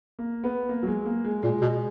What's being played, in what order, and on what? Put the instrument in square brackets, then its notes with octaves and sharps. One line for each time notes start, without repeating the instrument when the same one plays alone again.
[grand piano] A#3
B3
A#3
F#3
G#3
A#3
G#3
[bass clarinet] A#2 [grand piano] G#3
[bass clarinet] B2